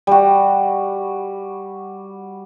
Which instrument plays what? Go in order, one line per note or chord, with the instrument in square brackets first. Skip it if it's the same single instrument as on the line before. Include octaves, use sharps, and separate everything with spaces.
[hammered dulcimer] G3 F#4